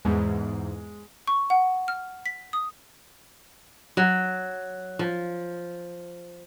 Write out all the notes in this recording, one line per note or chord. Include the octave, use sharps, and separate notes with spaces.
E2 G#2 G#3
C#6
F#5
F6
B6
D#6
F#3
F3